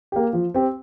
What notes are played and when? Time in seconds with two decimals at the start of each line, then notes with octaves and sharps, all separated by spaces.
0.12 A#3 G4
0.33 F3
0.54 C4 G4